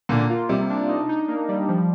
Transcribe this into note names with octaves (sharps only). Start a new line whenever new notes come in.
A#2 D3 A#3
F4
C3 G3
D4
D#4
D#4
A#3
G3
F3